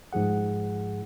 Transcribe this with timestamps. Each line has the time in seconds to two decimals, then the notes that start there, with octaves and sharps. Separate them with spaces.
0.13 G#2 F3 G#4 F#5